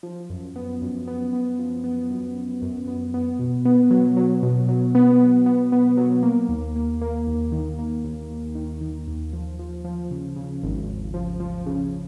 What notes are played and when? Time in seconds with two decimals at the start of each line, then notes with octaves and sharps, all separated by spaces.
0.03 F3
0.30 F#2
0.56 B3
0.82 F#2
1.08 B3
1.33 B3
1.59 F3
1.84 B3
2.10 F#2
2.36 F#2
2.62 F#2
2.87 B3
3.14 B3
3.39 B2
3.65 B3
3.90 F#3
4.17 F#3
4.43 B2
4.69 F#3
4.95 B3
5.19 B3
5.46 B3
5.72 B3
5.97 F#3
6.23 A#3
6.49 D#2
6.76 A#3
7.01 A#3
7.27 D#2
7.52 D#3
7.79 A#3
8.05 D#2
8.31 D#2
8.55 D#3
8.81 D#3
9.07 D#2
9.33 F3
9.59 F3
9.84 F3
10.11 C#3
10.36 C#3
10.63 G#1
10.89 G#1
11.14 F3
11.40 F3
11.66 C#3